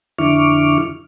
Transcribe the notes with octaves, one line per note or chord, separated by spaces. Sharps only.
F2 D3 E4 C#6 D6 F6